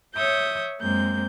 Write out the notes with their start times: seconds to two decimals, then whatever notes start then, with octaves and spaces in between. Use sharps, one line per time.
0.15 C#5 E5 D#6 G6
0.81 F#2 G#3 A#3 C4 G6